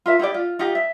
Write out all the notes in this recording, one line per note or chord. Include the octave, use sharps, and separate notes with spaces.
F4 A#4 E5
D#4 E4 G4 D5
F4
D#4 F4 G4
E5